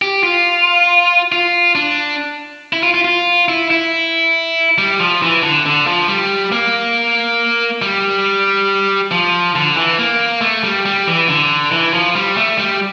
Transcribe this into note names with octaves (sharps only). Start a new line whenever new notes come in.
G4
F4
F4
D4
E4
F4
F4
F4
E4
E4
G3
F3
E3
D3
D3
F3
G3
A#3
G3
F3
D3
E3
A#3
A3
G3
G3
E3
D3
E3
F3
G3
A3
G3